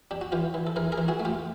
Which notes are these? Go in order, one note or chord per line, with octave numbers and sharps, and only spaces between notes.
D4 G4
F#4
E3 F4 G4
E3
A4
E3 G#4 A#4
G#4 A#4
E3
F#4 G#4
A3
F4 G4